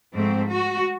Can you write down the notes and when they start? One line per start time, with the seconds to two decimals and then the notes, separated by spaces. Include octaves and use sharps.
0.14 G#2 F3 A3 C4
0.50 F#4